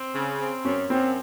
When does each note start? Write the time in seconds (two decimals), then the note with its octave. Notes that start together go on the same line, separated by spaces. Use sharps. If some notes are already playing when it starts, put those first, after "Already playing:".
Already playing: C4
0.15 C#3
0.41 C4
0.65 F#2 C#4
0.90 F#2 C4